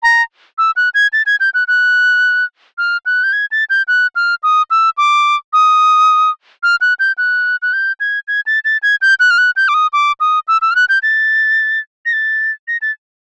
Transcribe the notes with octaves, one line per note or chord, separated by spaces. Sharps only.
A#5
E6
F#6
G#6
A6
G#6
G6
F#6
F#6
F6
F#6
G6
G#6
A6
G6
F#6
F6
D#6
E6
D6
D#6
F6
F#6
G6
F#6
F#6
G6
G#6
G#6
A6
A6
G#6
G6
F#6
F6
F#6
G6
D6
D#6
D6
D#6
E6
E6
F6
F#6
G6
A6
A#6
A6
A#6
A6